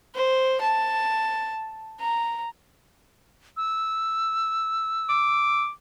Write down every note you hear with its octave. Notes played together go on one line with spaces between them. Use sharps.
C5
A5
A#5
E6
D6